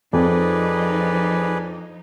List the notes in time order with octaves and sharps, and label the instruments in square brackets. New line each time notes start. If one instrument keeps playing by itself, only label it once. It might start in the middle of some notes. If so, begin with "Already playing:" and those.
[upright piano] F2 [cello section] F3 D#4 [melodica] G#4 B4 D5